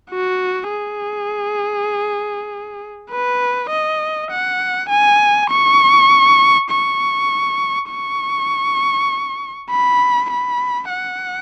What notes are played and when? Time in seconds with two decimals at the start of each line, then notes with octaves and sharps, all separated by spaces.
0.10 F#4
0.70 G#4
3.10 B4
3.70 D#5
4.31 F#5
4.90 G#5
5.50 C#6
6.70 C#6
7.91 C#6
9.70 B5
10.30 B5
10.90 F#5